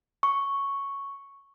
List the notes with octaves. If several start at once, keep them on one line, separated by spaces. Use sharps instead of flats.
C#6